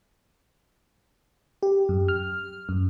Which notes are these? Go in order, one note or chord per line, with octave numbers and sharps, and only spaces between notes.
G4
F#2
F6
F#2